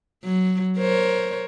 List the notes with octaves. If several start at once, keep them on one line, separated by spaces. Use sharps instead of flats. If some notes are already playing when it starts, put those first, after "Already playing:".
F#3
A#4 C5 C#5